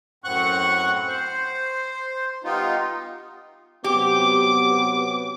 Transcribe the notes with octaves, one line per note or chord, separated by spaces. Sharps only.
F#2 A2 C4 F#5 C#6 F#6
C5
G3 B3 D#4 F4
C3 F#3 B3 G4 D6